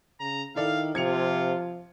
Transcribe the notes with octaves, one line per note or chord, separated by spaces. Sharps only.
C#3 A#5
D#3 E4 A4 D5 F5
C3 F3 F4 G#6 C#7 F7